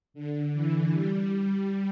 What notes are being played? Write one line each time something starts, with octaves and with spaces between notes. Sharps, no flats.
D3
E3
G3